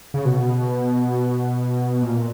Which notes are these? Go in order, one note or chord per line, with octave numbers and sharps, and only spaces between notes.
C#3
B2
A#2